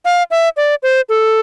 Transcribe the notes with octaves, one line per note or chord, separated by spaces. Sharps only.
F5
E5
D5
C5
A4